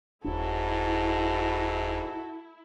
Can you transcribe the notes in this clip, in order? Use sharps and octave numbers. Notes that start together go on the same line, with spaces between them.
D#1 G#2 C#4 E4 F#4 A4